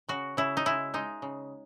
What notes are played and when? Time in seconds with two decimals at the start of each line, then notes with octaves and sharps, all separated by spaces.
0.09 C#3 F#4
0.37 C#3 E4
0.57 D#4
0.66 G#3 E4
0.94 G#3 D#4
1.22 C#3